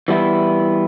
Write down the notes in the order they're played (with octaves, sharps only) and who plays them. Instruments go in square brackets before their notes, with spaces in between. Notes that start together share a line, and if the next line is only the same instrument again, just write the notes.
[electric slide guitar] E3 G3 B3 E4